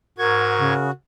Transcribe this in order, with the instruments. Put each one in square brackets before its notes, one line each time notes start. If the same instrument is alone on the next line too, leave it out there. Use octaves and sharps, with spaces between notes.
[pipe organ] G#2 C#6 G#6 [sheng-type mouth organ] F#4 [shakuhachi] A#4
[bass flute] C#3